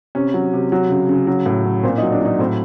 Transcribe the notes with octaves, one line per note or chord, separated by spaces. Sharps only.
C3 C#4
F#3
C3
F#3
C#3
C#3
F#3
A2
F#3
A#2 C4
D#4
F#3
D4
F#3 D#4
A2 C4